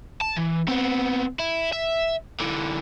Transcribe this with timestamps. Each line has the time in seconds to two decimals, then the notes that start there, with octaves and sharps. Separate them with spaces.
0.21 A5
0.36 E3
0.68 B3 C4
1.39 E4
1.73 E5
2.40 D3 E3